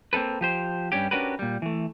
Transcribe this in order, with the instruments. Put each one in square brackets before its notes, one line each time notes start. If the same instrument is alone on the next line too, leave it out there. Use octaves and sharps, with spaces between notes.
[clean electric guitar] A#3 C4 D4 A4 B4
F3 G4 C5
G2 G3 C#4 G4
C#4 D4 F#4 G4 A#4 B4
A#2 G3
E3 A3